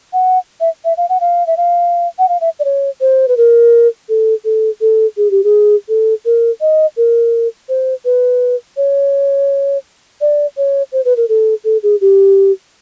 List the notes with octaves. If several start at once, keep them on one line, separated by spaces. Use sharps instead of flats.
F#5
E5
E5
F5
F#5
F5
E5
F5
F#5
F5
E5
D5
C#5
C5
B4
A#4
A4
A4
A4
G#4
G4
G#4
A4
A#4
D#5
A#4
C5
B4
C#5
D5
C#5
C5
B4
A#4
A4
A4
G#4
G4